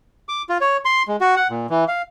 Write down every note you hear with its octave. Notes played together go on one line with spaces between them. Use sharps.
D6
F4
C#5
C6
G#3
F#4
F#5
A#2
E3
F5